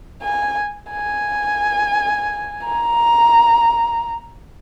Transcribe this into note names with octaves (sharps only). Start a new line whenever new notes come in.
G#5
G#5
A#5